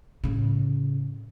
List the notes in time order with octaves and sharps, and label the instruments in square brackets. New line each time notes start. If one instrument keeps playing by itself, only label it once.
[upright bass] A2 C#3